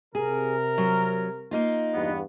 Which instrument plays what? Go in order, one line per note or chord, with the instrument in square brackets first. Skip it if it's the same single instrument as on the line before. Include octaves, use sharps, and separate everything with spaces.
[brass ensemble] C3 A#4 [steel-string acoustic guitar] G#4
[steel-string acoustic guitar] F#3
A#3 D#4 F4
[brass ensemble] E2 G2 B3